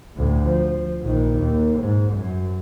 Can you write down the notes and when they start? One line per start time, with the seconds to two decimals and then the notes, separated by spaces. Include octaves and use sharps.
0.17 D2 A2
0.47 F3
1.03 A#1 D#3
1.39 D#2
1.80 G#2
2.14 F#2